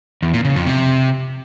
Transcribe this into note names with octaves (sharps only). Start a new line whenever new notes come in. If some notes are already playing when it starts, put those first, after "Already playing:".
E2
A#2
C#3
F2
C3